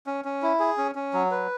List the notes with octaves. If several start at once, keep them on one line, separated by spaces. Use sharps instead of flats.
C#4
C#4
E4
G#4
C#4
C#4
F#3
B4